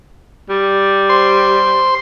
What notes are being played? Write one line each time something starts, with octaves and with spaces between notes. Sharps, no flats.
G3
C5 C6